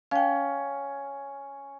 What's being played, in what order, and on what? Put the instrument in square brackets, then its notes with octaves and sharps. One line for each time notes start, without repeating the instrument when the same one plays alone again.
[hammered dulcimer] C#4 [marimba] F5 G5